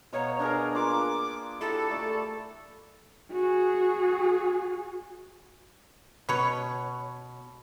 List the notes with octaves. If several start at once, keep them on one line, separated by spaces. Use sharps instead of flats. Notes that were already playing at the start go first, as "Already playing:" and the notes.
B2 C#5 F5 A#5
D4 G#4 A#4
A#3 F4 D6
E4 G4 A4
A3 D5 A5
F#4 G#4
B2 B4 C#5